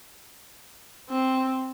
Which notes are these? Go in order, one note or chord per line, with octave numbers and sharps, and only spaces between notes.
C4